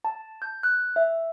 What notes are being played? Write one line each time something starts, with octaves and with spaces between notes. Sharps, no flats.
A5
G6
F#6
E5